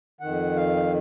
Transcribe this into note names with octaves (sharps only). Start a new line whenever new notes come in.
F2 D#3 F#5
F5